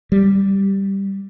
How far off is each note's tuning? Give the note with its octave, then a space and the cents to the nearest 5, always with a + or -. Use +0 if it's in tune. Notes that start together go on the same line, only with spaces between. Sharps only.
G3 +0